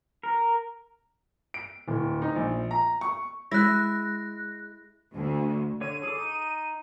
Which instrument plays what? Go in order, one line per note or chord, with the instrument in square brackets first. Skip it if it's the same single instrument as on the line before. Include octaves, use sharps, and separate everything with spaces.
[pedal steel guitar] A#4
[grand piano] D7
D1
D#4
A#1
A#5
C#6
[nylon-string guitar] G#3 [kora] E4 [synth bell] F#6 A#6
[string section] D2
[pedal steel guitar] D3 C#5 [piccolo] D#7
[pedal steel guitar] G#4 A4 D6
D#4